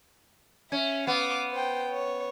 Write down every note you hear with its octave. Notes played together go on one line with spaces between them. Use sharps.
C#4 E5
B3 F5 D6
C5 G5
C#5